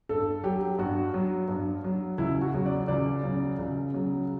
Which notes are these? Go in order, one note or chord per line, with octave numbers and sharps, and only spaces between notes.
G2 A4
F#3 G4
G2 F#4
F#3
G2
F#3
C#2 E4
F#4
C#3 F#3
D5
C#2 D5
C#3 F#3
C#2
C#3 F#3